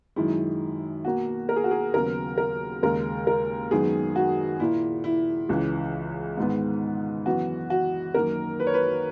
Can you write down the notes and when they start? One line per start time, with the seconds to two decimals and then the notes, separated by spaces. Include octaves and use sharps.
0.16 F#2 D#3 G#3 E4
1.05 B2 A#3 F#4
1.49 A#4
1.56 G#4
1.64 F#4
1.71 G#4
1.93 D#2 C#3 F#3 B3 A#4
2.38 A#4
2.82 D#2 C#3 G#3 A#4
3.27 A#4
3.71 F#2 D#3 G#3 B3 G#4
4.16 F#4
4.60 A#2 A#3 E4
5.04 E4
5.49 C#2 C#3 E3
6.37 G#2 D#3 G#3 B3
7.26 F#2 E3 B3 F#4
7.70 F#4
8.14 F#2 D#3 A#3 A#4
8.60 B4
8.67 C#5
8.74 B4